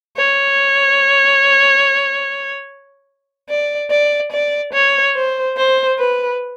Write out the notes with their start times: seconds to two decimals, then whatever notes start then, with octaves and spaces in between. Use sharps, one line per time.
0.17 C#5
3.49 D5
3.91 D5
4.32 D5
4.74 C#5
5.15 C5
5.57 C5
5.99 B4